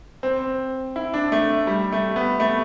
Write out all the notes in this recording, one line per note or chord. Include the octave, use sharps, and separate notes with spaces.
C4
E4
D4
A3
G3
A3
B3
A3